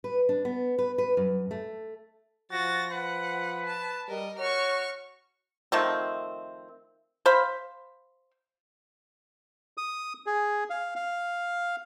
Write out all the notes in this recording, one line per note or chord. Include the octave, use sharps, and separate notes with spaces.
B4
D4
B3
B4
B4
F#2
A3
F3 F#4 A6 A#6
B4 F#5
A5
G3 A#4 D#5
F#4 C#5 C#6 F6
D#3 F3 A3 C4
C5 F5 B5
D#6
G#4
F5
F5